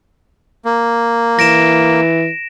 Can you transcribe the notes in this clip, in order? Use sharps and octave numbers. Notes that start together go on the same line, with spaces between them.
A#3
E3 A#6 D7 E7